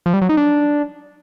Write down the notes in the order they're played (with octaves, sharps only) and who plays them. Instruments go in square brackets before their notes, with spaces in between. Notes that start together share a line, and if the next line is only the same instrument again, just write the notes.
[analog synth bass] F3
G3
F#3
D#4
D4